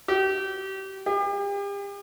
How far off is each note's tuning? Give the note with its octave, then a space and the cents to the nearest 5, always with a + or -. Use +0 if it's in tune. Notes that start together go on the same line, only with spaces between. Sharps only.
G4 -30
G4 +40